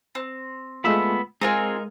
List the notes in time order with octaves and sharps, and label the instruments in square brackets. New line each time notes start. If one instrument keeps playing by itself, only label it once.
[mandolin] C4
[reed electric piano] G#3 A3 F4 [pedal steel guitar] B3 B5 E6
[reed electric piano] G#3 [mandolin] C4 F4 G#4 [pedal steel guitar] D#4 A#4